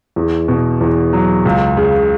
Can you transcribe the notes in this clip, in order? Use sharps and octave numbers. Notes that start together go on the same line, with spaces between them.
E2
B2
E2
F#3
C#2
C#3